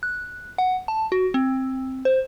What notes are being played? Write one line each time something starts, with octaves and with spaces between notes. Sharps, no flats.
F#6
F#5
A5
F#4
C4
C5